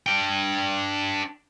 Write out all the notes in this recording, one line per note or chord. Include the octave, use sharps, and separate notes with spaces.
D4 G5